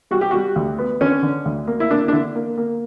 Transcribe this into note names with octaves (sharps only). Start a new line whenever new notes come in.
G3 F#4
G4
G3 F#4
D2
B3
D3 C#4
D3
D2
A#3
E4
A#3 D4
D4
D3 E4
A#3
A#3